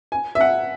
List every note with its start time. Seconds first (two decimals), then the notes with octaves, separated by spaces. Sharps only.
0.12 G#5
0.35 E5
0.41 F#5